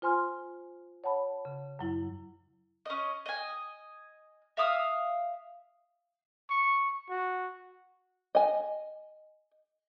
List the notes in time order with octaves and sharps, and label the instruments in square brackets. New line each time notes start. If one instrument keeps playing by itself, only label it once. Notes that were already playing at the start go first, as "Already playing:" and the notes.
[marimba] F4 C5 G#5 C6 F6
C#5 F#5 A5 B5
C#3
F#2 F#3 E4
[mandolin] C#4 D#5
D#5 G#5
E5 F5 D#6 E6
[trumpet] C#6
F#4
[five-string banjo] D#5 G#5